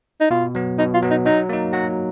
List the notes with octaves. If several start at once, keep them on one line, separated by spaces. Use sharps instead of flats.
D#4
B2 F4
F#3 B3
B2 D#4
F4
F#3 B3
D#4
F#3 D#4
A#3 D#4
F#3 F#4